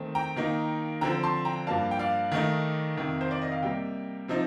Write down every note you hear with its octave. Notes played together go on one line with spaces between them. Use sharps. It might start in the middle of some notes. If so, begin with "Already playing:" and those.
Already playing: D#3 A3 C4
G5 A#5
D#3 A#3 D#4
D3 F3 C4 G5 A#5
A5 C6
G5 A#5
G2 F3 A#3 D4 F5 A5
G5
D5 F5
D#3 A3 D#4
F2 C3 D#3
C5
D5
D#5
F5
C3 G3 A#3 D#5 G5
C3 F3 C4 D#4